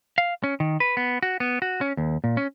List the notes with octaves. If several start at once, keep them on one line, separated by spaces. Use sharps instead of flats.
F5
C#4
D#3
B4
B3
F#4
B3
F#4
C#4
D#2
A#2
C#4